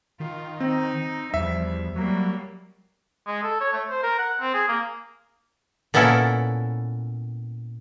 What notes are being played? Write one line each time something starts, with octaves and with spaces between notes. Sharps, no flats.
D#3 F4
C4 D#4
E2 F3 G3 E5
F#3 G3 A#3
G#3
A4
C#5
A3
C5
A#4
F#5
C4
G#4
A#3
A#2 B3 C#4 E4 A4 A#4